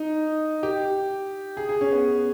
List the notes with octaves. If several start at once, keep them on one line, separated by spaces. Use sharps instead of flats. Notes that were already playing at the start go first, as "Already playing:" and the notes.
Already playing: D#4
G4
G#4
G#4
C#4
B3